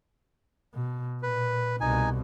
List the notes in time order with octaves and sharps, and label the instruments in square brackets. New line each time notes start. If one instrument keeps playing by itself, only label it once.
[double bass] B2
[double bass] A#2 [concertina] B4
[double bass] C2 B2 [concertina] D#4 G#5